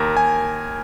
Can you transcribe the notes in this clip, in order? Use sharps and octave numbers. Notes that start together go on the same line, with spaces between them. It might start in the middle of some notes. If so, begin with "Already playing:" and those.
Already playing: D#2 A#4
D#2 G#5